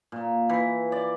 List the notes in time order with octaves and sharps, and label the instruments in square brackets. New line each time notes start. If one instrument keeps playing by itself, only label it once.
[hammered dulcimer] A#2
E3
D5